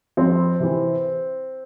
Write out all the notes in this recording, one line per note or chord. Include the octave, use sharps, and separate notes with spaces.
F2 C4
C3 E3